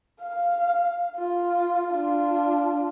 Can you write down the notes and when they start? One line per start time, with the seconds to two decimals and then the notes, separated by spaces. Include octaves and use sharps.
0.21 F5
1.16 F4
1.92 D4 F4